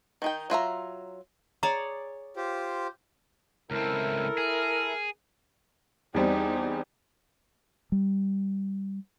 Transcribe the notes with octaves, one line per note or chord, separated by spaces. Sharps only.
D#3 D#4 G5
F#3 F4 E5 A#5
G#4 C#5 D5 A#5
F4 G4 C5
C#2 C4 E4 A4 A#4
G#4
E2 G3 C4 D#4 G4
G3